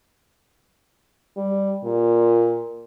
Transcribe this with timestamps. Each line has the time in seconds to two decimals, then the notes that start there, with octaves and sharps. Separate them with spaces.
1.37 G3
1.84 A#2